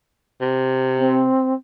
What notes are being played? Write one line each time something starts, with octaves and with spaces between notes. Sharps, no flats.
C3
C4